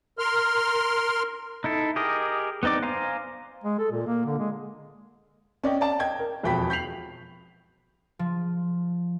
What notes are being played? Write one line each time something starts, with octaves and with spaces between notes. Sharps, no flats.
A#4 C6 F6
D#4 E4 A4
G4 G#4 A#4 D#5
B3 C4 D#4 D5 D6
C5 F5 G#5 A#5
G#3
A4
A#2
A#3
D3
G#3
C#4 D5 D#5 G5
D5 A5
D#5 G5 G#6
A#4
E1 F2 B2 G5 B5 B6
G6 B6 C7 F7 F#7
F3